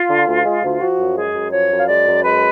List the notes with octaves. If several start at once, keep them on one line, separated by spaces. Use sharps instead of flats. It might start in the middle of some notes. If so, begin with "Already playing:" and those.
Already playing: F4
D3
D2
G#3
D2
F3 F#4
F#2
G#3 G#4
F#2
F3 C#5
F#2
F5
G#3 D5
F#2
G#3 B4